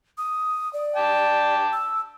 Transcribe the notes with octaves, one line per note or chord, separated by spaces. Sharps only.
D#6
D5
G5 A5 D6
E6